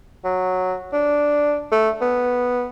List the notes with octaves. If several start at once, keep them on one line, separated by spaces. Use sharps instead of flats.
F#3
D4
A3
B3